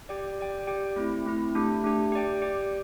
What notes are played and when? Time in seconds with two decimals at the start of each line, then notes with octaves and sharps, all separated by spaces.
0.09 G4 D5 G5
0.39 G4 D5 G5
0.67 G4 D5 G5
0.96 A3 C4 E4
1.26 A3 C4 E4
1.55 A3 D4 G4
1.84 A3 D4 G4
2.12 G4 D5 G5
2.42 G4 D5 G5